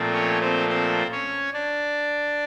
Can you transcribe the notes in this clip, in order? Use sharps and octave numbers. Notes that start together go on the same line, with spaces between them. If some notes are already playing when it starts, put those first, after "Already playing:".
Already playing: A#2 F3 A3 C4
C#4 C#5
C4 C5
C4 C5
C#4 C#5
D4 D5